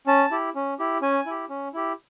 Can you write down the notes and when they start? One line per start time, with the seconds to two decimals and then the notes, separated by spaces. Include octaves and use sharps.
0.07 C#4 A5
0.31 E4 G4
0.55 C#4
0.79 E4 G4
1.02 C#4 G#5
1.26 E4 G4
1.49 C#4
1.74 E4 G4